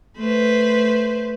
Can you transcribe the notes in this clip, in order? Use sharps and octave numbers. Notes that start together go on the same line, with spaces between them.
A3 B4 C5